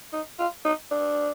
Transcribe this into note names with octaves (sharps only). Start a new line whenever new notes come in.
D#4
F4
D#4
D4